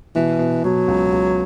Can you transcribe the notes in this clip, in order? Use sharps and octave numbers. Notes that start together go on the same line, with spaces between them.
B2 E3
B2
B2 F#3
C#2
C#2